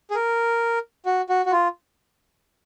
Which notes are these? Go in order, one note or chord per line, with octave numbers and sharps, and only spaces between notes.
G#4
A#4
F#4
F#4
F#4
F4